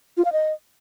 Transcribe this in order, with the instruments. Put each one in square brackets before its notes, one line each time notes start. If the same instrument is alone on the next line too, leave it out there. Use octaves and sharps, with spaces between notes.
[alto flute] F4
F5
D#5